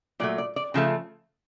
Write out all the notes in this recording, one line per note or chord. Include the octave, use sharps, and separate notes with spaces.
A#2 F#3 A3 D5
D5
D5
C#3 F3 A3